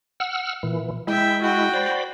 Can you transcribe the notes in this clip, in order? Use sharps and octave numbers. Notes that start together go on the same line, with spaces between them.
F#5 E6 F6
A#2 E3
G#3 E4 E5 G5
F#4 G5
C5 D5 B5